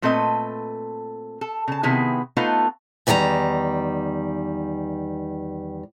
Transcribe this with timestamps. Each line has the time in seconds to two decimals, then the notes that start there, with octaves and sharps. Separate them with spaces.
0.02 A#2 A3 C4 A4 B4 D#5
1.41 A4
1.68 C#3 A5
1.83 C3 D#3 B3 E4 G#4
2.37 A3 B3 D#4 F4 A4 B4
3.07 E2 D#3 G3 C#5 A#5